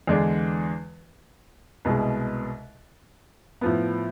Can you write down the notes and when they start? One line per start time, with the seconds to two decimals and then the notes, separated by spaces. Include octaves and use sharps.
0.07 E2 D3 G#3 D4
1.85 C2 B2 G#3
3.61 A2 F3 B3